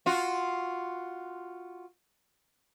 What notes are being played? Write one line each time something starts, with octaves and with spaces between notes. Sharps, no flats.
F4 F#4